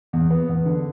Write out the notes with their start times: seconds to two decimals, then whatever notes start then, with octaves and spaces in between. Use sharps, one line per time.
0.13 E2
0.30 B3
0.49 E2
0.65 D3